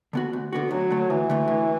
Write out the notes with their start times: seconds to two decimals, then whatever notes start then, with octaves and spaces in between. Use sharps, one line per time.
0.13 D3 B3 F#4
0.33 D2
0.53 D3 B3 F#4
0.71 D2 F#3
0.91 D3 A3
1.10 D2 E3
1.30 D3 A3
1.48 A2